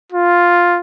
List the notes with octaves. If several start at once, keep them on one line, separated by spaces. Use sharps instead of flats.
F4